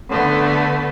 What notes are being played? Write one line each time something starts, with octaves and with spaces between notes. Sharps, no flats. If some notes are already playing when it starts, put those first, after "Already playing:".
D3 A3 B3